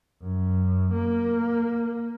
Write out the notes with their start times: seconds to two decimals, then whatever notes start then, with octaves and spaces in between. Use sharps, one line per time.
0.22 F#2
0.93 A#3